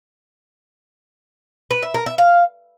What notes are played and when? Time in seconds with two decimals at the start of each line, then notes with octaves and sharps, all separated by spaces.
1.71 B4
1.82 E5
1.94 A#4
2.06 E5
2.18 F5